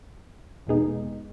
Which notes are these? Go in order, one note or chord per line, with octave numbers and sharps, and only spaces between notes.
E2 B2 G#3 B3 D#4